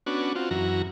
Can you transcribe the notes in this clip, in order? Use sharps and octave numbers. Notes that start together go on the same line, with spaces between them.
B3 C#4 D4 F#4
C4 F4 F#4
F#2 E3 F#4 A#5